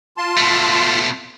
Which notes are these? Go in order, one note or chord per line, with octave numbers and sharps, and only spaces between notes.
F4 A5 C6
B2 A3